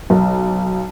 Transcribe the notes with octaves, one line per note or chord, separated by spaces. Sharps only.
B1